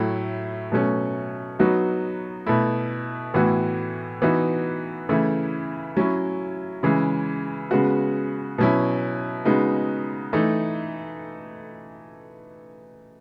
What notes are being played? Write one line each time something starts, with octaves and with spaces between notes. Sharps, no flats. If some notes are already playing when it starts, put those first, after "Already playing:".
Already playing: A2 F#3 A3 E4
B2 F#3 A3 C#4
F#3 B3 D#4 F#4
B2 A3 E4
A2 E3 B3 F#4
E3 B3 D#4 F#4
C#3 E3 A3 E4
F#3 C#4 E4
C#3 E3 G#3
C#3 G#3 B3 F#4
B2 F#3 C#4 E4
C#3 G#3 B3 D#4 F#4
E3 A3 D#4